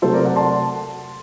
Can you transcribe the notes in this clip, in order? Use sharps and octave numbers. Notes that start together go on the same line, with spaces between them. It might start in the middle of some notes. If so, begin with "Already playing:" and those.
C3 F#3 A3 A4 C5
A#4 D5
D5 F#5
A5 C6